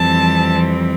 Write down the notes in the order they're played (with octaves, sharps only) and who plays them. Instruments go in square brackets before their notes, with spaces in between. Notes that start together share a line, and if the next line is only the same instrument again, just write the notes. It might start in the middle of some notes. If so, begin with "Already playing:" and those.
Already playing: [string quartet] F2 E3 G3 C4 A5